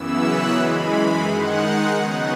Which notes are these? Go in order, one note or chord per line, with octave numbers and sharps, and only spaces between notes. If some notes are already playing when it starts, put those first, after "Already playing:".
Already playing: F#2 C#3 E3 B3 E4 E6
F#6
F#2 E3 G#3 B5
D#3 G#3 D#4 F#5
C#3 F#3 B3 D#4 F#5